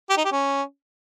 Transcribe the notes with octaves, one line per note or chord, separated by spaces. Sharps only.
G4
D#4
G4
C#4